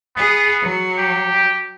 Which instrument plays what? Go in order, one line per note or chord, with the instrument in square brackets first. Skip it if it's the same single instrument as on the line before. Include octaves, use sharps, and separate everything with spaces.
[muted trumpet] B3 [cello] G#4
[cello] F#3
[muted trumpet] G4